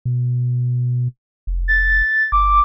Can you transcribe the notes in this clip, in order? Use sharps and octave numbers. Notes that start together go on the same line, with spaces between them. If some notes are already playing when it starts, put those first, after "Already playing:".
B2
F1
A6
G1 D6